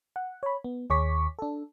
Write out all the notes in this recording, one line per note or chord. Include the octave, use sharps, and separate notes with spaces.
F#5
C#5 B5
B3
D#2 G#4 C#5 C#6 D6 B6
D4 A4